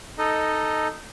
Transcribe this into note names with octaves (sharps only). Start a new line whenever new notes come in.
D#4 A4 D#5